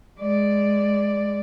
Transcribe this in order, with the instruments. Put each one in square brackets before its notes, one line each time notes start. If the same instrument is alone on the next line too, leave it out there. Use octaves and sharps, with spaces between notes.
[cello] G#3 D5